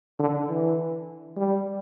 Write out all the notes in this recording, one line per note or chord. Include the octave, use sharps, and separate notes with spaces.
D3
E3
G3